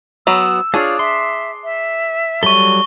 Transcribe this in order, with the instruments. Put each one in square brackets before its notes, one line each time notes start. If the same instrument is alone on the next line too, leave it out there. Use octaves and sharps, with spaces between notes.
[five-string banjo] F#3 B3 [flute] E6
[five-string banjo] D4 G#4 [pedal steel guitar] F4 C#5 F5
[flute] E5 [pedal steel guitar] C6
[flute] E5
[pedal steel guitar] F#3 G3 A4 [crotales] C#6 G7